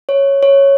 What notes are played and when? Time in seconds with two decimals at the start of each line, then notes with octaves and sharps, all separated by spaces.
0.09 C#5
0.43 C#5